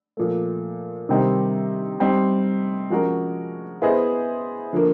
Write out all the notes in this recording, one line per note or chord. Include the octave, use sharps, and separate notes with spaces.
A#2 F3 A3
C3 D#3 G3 C4 D#4
G3 C4 D#4
F3 G#3 C#4 F#4 A#4
B3 E4 G#4 C5 D#5
D3 F3 A#3